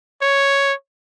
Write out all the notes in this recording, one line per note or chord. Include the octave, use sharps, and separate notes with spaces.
C#5